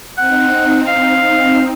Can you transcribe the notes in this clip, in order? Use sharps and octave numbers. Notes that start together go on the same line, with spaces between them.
C4 D#4 F#5
F5